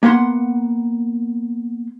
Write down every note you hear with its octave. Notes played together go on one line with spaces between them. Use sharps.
A#3 B3 F#5 C6